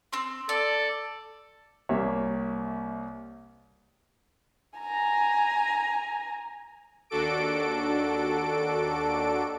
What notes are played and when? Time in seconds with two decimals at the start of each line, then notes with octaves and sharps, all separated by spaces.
0.13 C4 C6
0.49 A4 D5
1.89 C2 C3 A#3 C#5 E5
4.79 G#5 A#5
7.10 D#2 D4 F#4 A4 D6 D7